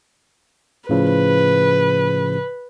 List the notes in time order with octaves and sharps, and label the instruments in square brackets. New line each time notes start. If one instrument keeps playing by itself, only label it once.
[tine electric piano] A2 C#3 F3 [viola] B4